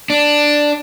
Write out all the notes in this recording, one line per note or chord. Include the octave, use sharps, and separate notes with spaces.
D4